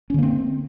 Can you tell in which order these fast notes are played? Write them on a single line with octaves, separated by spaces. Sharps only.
C#4 D3 A#3 C4